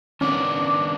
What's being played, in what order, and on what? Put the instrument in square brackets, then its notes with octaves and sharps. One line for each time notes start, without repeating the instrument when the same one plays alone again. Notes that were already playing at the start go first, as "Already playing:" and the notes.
[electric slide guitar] D#3 B3 D4 [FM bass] C#4 [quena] D6